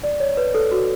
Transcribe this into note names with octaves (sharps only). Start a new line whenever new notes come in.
D5
C#5
B4
A4
F#4